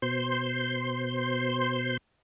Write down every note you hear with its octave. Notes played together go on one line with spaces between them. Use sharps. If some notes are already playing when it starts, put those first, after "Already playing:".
B2 C5 C6